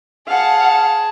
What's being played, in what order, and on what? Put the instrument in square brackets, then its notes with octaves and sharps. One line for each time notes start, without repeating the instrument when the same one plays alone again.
[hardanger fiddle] G#4 A5 [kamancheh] F5 F#5